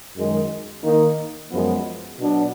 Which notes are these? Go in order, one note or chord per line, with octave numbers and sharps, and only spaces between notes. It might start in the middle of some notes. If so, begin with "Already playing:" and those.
F#2 D#3 G#3
D#3 A#3 D#4
F#2 F3 G#3 B3
B2 F#3 B3 D4